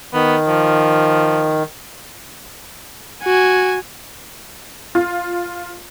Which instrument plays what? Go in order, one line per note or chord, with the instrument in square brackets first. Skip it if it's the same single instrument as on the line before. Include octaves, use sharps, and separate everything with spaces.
[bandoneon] D#3 [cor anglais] B3
[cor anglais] F3
[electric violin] F#4 G#5
[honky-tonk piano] F4